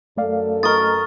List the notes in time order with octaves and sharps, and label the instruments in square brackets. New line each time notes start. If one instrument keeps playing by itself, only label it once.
[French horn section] F#2 A4 [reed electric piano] A3 D5 F5
[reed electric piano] A3 D#5 A#5 [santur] A#4 D#6 [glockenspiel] C#6 A6